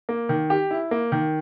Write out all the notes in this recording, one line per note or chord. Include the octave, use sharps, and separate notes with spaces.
A#3
D#3
G4
E4
A#3
D#3